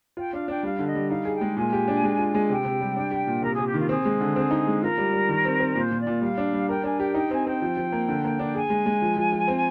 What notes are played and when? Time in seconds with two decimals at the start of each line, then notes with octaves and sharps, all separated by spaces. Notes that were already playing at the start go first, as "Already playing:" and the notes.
0.17 F4 G5
0.32 D4 F5
0.48 D4 G5
0.63 G3 F5
0.79 D3
0.87 D#5
0.95 G3
1.10 D#4 F5
1.25 G#4
1.33 G5
1.41 G#3
1.57 A#2 G#5
1.73 G4
1.88 D4
2.04 G#3
2.19 F4
2.35 G#3
2.49 C3 G5
2.65 C3
2.81 G3
2.96 D4
3.11 G4
3.27 A#2
3.42 C3 A#4
3.54 C3 G#4
3.66 G4
3.74 D#3 F4
3.89 C4 G#4
4.05 G#3
4.20 D3
4.36 C4
4.51 D#4
4.67 G#3
4.82 F4 A#4
4.98 G3
5.13 G3
5.29 D#3
5.45 C4
5.60 C4
5.75 A#2 C5
5.91 A#2
5.99 D5
6.07 A#2
6.21 G3 F5
6.38 D4
6.53 G3
6.68 A#4 G5
6.83 D4 G#5
6.99 G4 G5
7.15 D#4 G5
7.31 C4 G#5
7.46 C4 G5
7.62 F3
7.77 F3
7.92 A#3
8.08 D3
8.24 A#3
8.39 D4
8.55 G#4 G#5
8.70 G#3
8.86 G#3
9.02 F3
9.17 F3
9.32 F3
9.48 C4